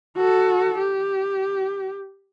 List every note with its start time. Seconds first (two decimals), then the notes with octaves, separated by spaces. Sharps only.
0.17 F#4 A4
0.78 G4